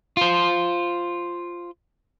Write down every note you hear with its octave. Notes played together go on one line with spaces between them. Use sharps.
F4 C5